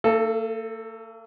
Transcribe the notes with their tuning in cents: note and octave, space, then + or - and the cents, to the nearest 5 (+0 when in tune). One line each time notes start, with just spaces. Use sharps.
A#3 -45 A4 +0